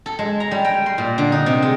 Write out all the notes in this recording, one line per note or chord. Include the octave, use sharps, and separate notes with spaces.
A4
G#3
A#5
G3
G5
C6
A#2
D3
D#4
C3
G#3